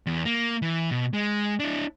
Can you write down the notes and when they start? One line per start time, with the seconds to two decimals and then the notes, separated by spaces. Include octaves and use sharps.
0.07 E2
0.25 A#3
0.62 E3
0.91 B2
1.14 G#3
1.60 D4 E4